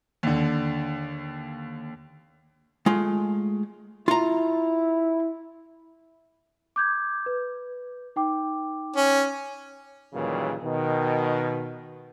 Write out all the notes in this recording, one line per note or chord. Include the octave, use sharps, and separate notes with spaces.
D#2 D3
G#3 A3 F4
E4 F4 A#5
D6 G6 G#6
B4
D#4 G5 D6
C#4
D#2 A#2 C#3 E3 F#3 G3
B2 D#3